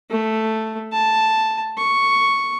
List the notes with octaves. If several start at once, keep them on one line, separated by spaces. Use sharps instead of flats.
A3
A5
C#6